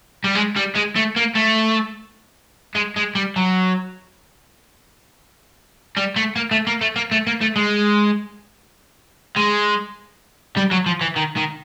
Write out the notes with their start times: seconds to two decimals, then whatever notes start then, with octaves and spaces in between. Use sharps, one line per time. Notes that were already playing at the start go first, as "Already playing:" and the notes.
0.24 G3
0.35 G#3
0.56 G3
0.75 G#3
0.96 A3
1.16 A#3
1.35 A3
2.75 G#3
2.96 G#3
3.15 G3
3.36 F#3
5.97 G3
6.16 A3
6.36 A#3
6.51 A3
6.67 A#3
6.81 A3
6.96 A#3
7.11 A3
7.27 A#3
7.41 A3
7.56 G#3
9.36 G#3
10.57 G3
10.71 F#3
10.86 F3
11.01 E3
11.16 D#3
11.37 D#3